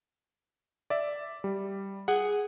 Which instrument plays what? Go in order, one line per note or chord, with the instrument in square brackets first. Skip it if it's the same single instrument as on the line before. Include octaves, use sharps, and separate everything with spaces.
[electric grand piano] D5 E5
G3
[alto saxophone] G#4 [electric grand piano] F#5